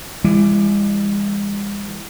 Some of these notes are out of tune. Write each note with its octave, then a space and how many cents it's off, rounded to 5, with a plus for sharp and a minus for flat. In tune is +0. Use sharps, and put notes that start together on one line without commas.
E3 +25 G#3 -45